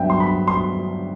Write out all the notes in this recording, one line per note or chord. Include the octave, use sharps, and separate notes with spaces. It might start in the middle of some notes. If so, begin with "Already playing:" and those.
Already playing: G2 F#3 B3 E5 G5
C6
B5
C6